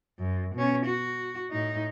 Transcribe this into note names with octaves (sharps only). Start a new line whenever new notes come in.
F#2
B2 C#4
F#4
A2 D#4